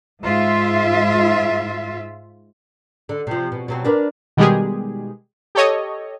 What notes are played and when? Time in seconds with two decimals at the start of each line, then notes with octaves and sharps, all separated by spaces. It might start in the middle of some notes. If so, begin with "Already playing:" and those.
0.22 G#2 F4 E5
3.09 D3
3.27 C3 F3
3.52 B2
3.68 B2 F#3 C4
3.85 D4 A#4 B4
4.37 B2 D#3 G3 G#3 G4 G#4
5.55 G4 A4 C#5 D#5